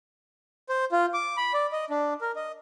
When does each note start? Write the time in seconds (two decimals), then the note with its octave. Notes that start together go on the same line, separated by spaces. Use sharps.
0.69 C5
0.92 F4
1.14 D6
1.37 B5
1.54 D5
1.72 D#5
1.90 D4
2.21 A#4
2.36 D#5